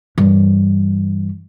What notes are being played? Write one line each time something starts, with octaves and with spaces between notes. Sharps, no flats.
G2 E3